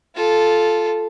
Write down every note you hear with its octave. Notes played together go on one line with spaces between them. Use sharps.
F4 A4